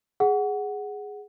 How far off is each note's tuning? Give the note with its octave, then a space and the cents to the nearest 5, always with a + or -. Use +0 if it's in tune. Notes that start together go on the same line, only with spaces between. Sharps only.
G#4 +0 F#5 +0